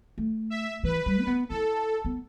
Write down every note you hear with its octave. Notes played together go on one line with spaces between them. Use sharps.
A3
E5
E3 B4
G3
D4
B3
E4 A4
B3